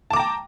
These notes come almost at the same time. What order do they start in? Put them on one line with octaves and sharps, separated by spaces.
A5 D6 A#5 G5